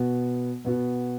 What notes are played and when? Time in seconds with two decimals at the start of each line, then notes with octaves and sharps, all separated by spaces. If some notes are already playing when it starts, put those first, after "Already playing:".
Already playing: B2 B3 F#4
0.65 B2 B3 F#4